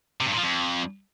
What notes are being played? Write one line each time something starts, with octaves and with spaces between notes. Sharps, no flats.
C3
G2
A#2
F3
F2